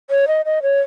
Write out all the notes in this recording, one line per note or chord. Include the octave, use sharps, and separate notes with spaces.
C#5
D#5
D#5
C#5